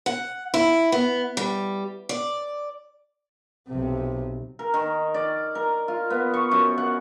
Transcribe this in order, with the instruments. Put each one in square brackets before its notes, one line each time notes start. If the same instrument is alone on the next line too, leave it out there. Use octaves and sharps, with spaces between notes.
[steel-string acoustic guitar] F#5
E4
B3
G3
D5
[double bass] B1 C3
[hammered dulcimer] A#4
D#3
D5
A#4
F4
B3
C#6
F#2
F#5